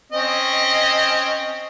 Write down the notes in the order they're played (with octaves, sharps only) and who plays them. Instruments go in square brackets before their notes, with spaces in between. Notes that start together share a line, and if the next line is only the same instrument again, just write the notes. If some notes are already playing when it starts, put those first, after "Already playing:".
[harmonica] C4 C#4 D#5